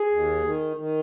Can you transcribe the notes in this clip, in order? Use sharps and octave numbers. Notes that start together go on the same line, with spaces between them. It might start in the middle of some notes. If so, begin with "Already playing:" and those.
Already playing: G#4
D#2
D#3
D#3